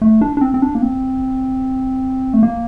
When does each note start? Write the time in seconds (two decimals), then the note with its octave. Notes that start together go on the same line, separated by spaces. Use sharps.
0.02 A3
0.21 D4
0.37 D4
0.41 C4
0.54 C4
0.62 D4
0.75 A#3
0.82 C4
2.34 A3
2.43 A#3